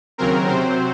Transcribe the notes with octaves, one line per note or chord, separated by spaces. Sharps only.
D#2 C#3 F#3 C4 A#4
C3 F#3 C4 C5